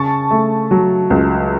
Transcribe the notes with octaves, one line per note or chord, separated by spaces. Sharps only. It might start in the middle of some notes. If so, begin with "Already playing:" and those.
Already playing: C#3 A5 C#6
A3
F#3
C#2